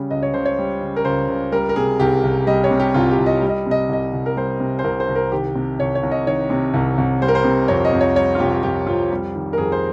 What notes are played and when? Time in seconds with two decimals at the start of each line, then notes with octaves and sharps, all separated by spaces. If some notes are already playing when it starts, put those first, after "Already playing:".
Already playing: C#3 G3
0.10 C#2 D#5
0.23 C#5
0.34 C#2 C5
0.46 C#5
0.59 G3
0.81 C#3
0.96 A#4
1.05 C#2 C5
1.29 C#2
1.52 G3 A#4
1.69 A#4
1.76 C3 G#4
2.00 C2 G4
2.23 C2
2.47 G3 D#5
2.64 C#5
2.71 C3
2.80 G4
2.94 C2 F4
3.11 G4
3.19 C2
3.26 D#5
3.42 G3
3.49 D#5
3.67 C3 D#5
3.89 C2 D#5
4.13 C2
4.26 A#4
4.36 G3 C5
4.60 C3
4.79 C5
4.84 C2 A#4
5.00 C5
5.09 C2
5.15 A#4
5.32 D#3 G4
5.56 C3
5.79 C2 C#5
5.95 C#5
6.03 C2
6.11 D#5
6.27 D#3 C#5
6.50 C3
6.74 C2
6.98 C2
7.22 G3 C5
7.28 A#4
7.35 C5
7.44 C3
7.68 F2 C#5
7.85 D#5
7.92 F2
8.01 C#5
8.16 G3 C#5
8.35 F4
8.40 C3 G4
8.52 G4
8.63 F2 G4
8.87 F2 F4
9.11 G3
9.35 D#3
9.53 A#4
9.58 F2 G#4
9.72 C5